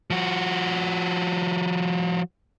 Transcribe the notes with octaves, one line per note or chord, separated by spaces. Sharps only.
F3 F#4